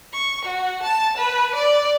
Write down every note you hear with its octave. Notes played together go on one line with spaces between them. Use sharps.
C#6
F#4
A5
B4
D5